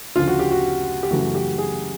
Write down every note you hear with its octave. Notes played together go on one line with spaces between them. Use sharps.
D2 C#3 F3 F4
F#4
G4
F#4
G4
F#2 C#3 E3 A3 F#4
G4
G#4